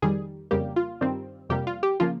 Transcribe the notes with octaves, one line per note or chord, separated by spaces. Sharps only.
F2 D#3 G3 G#4
F2 C#3 G3 A#3 G4
F4
G2 D#3 G3 C4
F2 C3 G3 A#3 G4
F4
G4
C#3 F3 A#3 F4